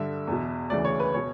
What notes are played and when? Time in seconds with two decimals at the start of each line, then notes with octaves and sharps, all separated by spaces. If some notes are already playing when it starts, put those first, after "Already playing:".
Already playing: G2 D3 E5
0.27 E2 B2
0.70 D2 C#3 E3 D5
0.85 C#5
1.00 B4
1.14 B2 C#5